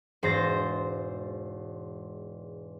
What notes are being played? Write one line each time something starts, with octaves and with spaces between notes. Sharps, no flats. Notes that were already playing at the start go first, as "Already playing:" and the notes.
E1 G#2 C5 A6 A#6